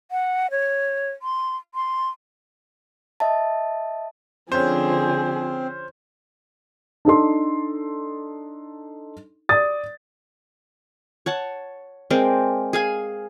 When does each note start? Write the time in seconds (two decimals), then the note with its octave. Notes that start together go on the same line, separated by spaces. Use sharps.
0.11 F#5
0.51 C#5
1.22 C6
1.75 C6
3.20 D#5 E5 A5
4.52 D3 F3 C4 C#4 G#4 C5
7.05 D4 D#4 A4 C6
9.49 D5 D#6 A6
11.26 C#5 F#5 A5
12.10 G#3 C4 A#4 D5
12.73 G#4 F5 G#5